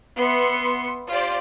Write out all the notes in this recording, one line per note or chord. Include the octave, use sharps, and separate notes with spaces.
B3 B4 E5 C6 C#7
F4 G4 C5 D5